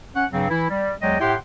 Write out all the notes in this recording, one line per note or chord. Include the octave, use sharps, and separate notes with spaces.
C#4 F#5
G2 C#3 F#3 C4
E3 E4
G3
E2 F#3 G#3 D5 D#5 G5
A2 E4 G4 F#5 G5 C6